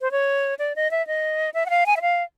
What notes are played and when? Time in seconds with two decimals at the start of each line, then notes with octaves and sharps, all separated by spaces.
0.01 C5
0.11 C#5
0.59 D5
0.76 D#5
0.91 E5
1.07 D#5
1.54 E5
1.66 F#5
1.70 F5
1.86 G#5
1.97 E5
2.02 F5